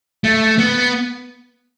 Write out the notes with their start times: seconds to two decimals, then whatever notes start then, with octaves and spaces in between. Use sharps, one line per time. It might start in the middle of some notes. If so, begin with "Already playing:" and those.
0.24 A3
0.58 B3